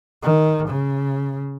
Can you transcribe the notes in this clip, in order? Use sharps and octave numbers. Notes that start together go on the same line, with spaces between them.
D#3
C#3